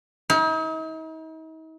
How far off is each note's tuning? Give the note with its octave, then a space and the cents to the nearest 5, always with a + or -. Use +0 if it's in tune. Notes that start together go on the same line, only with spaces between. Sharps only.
D#4 +45